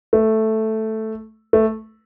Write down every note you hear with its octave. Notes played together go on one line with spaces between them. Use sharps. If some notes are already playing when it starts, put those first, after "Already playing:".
A3
A3